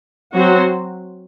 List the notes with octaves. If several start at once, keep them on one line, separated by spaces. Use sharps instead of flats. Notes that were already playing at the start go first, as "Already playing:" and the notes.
F#3 C4 F#4 C5